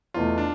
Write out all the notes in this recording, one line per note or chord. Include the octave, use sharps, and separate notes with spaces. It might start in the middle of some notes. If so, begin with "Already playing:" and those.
E2 B2 A3 F4
D4